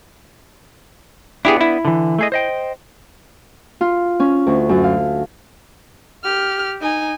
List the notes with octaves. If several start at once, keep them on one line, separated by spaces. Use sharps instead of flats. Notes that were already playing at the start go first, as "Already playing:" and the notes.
B3 D4 E4 G4 G#4
E4
D3 E3
A3 G#4 D#5
C5 D#5 G5
F4
C#4
D2
F#2
F5
G4 F6
D#4 G#5